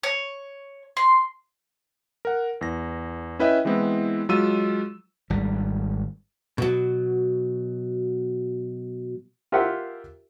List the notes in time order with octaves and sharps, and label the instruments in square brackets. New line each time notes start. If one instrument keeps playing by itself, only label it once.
[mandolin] C#5
C6
[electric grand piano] A#4 F#5
E2 A#6
C#4 E4 B4 D#5 E5 G5
E3 G#3 B3 C4 E4
F#3 G#3 F4 E6 D#7
[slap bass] G#1 G3
[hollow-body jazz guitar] B2 F#3
[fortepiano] F4 G4 A#4 C5 E5 F#5